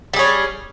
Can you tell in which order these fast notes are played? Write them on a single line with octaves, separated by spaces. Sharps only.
G3 G#4 C#4